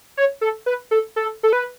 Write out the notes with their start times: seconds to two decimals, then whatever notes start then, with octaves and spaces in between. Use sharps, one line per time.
0.17 C#5
0.41 A4
0.66 B4
0.91 A4
1.16 A4
1.43 A4
1.53 B4